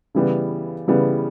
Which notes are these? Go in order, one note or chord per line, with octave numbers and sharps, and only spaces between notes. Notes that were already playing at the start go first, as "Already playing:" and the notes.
C#3 E3 G3 B3
C#3 E3 G3 B3